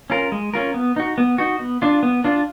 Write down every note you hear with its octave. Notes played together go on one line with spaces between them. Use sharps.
C#4 F4 A#4
G#3
C#4 F4 A#4
B3
D#4 F#4
B3
D#4 F#4
B3
D4 F4
B3
D4 F4